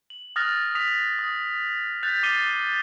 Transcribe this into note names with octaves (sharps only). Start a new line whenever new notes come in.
F#7
D#6 F6 F#6 A6 A#6 F7
D#6 B6 F7
D#6
F#6 G6 A6 B6 F7
D6 A6 C7 D#7 G7